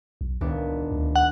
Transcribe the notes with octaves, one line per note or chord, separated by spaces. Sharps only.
B1
D#1 C#2 B3 D4
D2
F#5